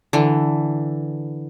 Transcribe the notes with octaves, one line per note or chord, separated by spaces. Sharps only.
D3 E3